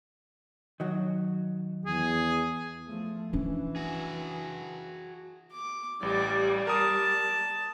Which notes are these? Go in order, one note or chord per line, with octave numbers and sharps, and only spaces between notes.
D#3 F#3 F#4
E2 G#4
F3 A3
E3 C#4 D4
F#4 G#4
D6
A1 G3 D5
A#4 A5 D#6